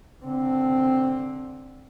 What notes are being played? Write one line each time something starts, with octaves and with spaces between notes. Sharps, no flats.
D3 C4